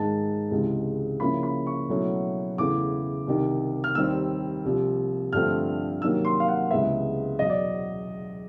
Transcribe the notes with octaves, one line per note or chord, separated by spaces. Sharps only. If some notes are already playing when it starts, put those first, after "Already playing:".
Already playing: G#2 D#3 G#3 A5
C#2 C3 E3 G#3
C#3 F3 A#3 C#4 E4 B5
B5
C#6
B2 F#3 A3 C#4 E4
E2 C#3 E3 A3 D6
C2 C3 D#3
F6
D#2 D#3 G3 C4 E6
C2 C3 F3
G2 D3 F3 A3 C4 F6
C3 D#3 F#3 A#3 E6
C6
F5
F#5
C#2 C3 E3 G#3 B3 E5
E2 B2 F#3 D#5
D5